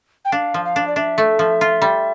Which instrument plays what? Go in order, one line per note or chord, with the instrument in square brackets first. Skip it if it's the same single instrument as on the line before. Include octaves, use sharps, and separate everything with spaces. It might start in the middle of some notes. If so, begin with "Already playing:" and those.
[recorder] G5
[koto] D4 [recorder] F5
[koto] F3
[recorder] F5
[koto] D4
[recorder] D5
[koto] D4 [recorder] E5
[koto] A3
F3
F4
G3